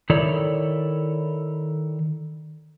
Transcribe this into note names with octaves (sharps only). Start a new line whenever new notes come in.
D#3 E4 A4 C#5 D5